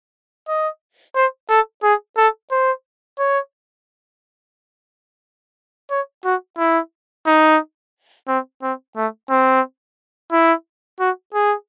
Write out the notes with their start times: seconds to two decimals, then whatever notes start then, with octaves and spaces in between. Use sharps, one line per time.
0.48 D#5
1.15 C5
1.50 A4
1.83 G#4
2.17 A4
2.51 C5
3.19 C#5
5.90 C#5
6.24 F#4
6.58 E4
7.27 D#4
8.28 C4
8.62 C4
8.96 A3
9.30 C4
10.32 E4
11.00 F#4
11.34 G#4